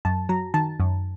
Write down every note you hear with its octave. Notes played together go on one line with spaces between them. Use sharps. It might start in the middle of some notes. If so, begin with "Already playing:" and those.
F#2 A5
F#3 A#5
D#3 A5
F#2